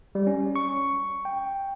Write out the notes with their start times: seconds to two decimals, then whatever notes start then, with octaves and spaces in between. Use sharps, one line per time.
0.15 G3
0.27 C#4
0.56 C#6
1.25 G5